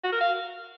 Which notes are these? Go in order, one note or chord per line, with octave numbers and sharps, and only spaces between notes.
F#4
A#4
F5